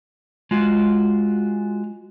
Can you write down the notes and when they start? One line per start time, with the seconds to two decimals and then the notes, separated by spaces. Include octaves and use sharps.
0.51 G#3 F4 F#4